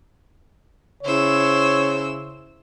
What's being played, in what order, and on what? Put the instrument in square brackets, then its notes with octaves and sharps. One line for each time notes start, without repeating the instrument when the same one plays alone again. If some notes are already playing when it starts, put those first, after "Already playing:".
[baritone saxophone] C#3 [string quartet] E4 C5 E6 [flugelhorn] C#5